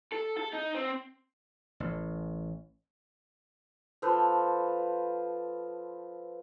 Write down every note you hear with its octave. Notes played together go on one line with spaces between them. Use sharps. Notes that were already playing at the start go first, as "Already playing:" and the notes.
A4
A4
D#4
C4
A1
F3 A4 B4 C5